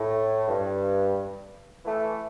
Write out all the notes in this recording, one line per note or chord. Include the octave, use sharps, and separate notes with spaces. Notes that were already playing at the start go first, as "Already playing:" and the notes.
Already playing: A2
G2
E3 A3